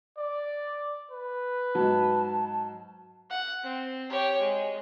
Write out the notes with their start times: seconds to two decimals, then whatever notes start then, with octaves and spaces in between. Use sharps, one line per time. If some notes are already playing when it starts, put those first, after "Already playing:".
0.18 D5
1.11 B4
1.75 G#2 F#3 A5
3.30 F#5
3.64 C4
4.10 G4 C#5
4.40 G#3